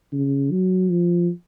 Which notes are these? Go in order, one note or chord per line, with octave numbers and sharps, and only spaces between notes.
C#3
F#3
F3